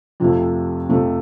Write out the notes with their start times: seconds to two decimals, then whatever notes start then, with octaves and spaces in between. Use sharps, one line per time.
0.20 F2 C3 F3 A3
0.89 F2 C3 F3 A3